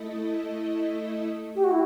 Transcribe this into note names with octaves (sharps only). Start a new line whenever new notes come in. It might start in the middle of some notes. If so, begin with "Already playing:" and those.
Already playing: A3 E4 A4 D#5
G4
F#4
E4